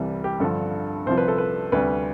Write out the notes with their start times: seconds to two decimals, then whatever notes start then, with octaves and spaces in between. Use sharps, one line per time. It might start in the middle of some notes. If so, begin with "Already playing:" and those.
Already playing: C2 C3 E3 G3
0.24 G4
0.40 G2 D3 F3 A4
1.06 C2 C3 F3 C5
1.18 B4
1.28 A4
1.38 B4
1.72 D2 C3 G3 B4